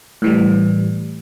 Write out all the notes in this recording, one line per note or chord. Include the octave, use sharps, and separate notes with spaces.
A2 E3 G3